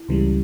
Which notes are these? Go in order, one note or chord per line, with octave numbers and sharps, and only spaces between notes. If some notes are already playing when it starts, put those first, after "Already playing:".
Already playing: E4
C#2 C#3 E3 G3